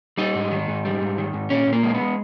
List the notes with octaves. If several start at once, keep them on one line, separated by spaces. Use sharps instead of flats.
G3 D#4
G#2
D#3
G#2
G3
G#2
D#3
G#2
A#2 C#4
A#2
A#3
G#3
B3
G#3